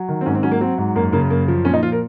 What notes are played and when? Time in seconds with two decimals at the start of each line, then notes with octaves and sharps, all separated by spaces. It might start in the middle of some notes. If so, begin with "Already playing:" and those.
Already playing: F#3
0.08 D#3
0.21 C4
0.26 G#2 C#4
0.35 C4
0.43 F#3 C#4
0.52 A#3
0.61 F#3 C4
0.78 G#2
0.96 F#2 A#3
1.13 C#3 A#3
1.30 F#2 A#3
1.48 F3
1.65 A#2 C#4
1.74 D#4
1.82 F3 F4
1.92 A#4